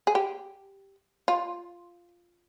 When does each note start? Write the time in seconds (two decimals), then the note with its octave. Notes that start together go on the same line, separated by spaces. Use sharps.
0.07 G#4
0.15 G4
1.28 F4